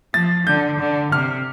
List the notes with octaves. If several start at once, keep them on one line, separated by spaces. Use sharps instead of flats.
F3 A6
D3 G6
D3
C3 F6